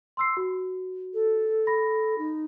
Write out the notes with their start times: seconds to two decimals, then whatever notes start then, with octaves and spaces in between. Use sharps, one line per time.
0.17 C6 E6 C7
0.37 F#4
1.13 A4
1.67 B5 A#6
2.18 D#4